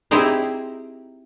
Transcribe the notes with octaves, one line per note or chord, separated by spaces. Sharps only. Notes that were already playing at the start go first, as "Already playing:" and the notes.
C4 D#4 E4 G4 G#4 C5